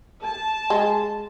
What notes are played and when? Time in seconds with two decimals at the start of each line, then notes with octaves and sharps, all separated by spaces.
0.22 A5
0.70 G#3